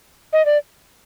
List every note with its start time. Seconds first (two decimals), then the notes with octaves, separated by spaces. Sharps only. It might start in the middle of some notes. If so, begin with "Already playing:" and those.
0.33 D#5
0.45 D5